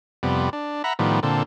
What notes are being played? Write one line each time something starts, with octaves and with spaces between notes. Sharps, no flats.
F2 C3 G3 B3
D4
E5 F#5 A#5 B5
A2 D#3 F3 G3 B3
A#2 D3 C4 A4